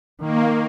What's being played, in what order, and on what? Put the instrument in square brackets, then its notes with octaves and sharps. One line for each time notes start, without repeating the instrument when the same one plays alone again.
[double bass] D#3 [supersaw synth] A#3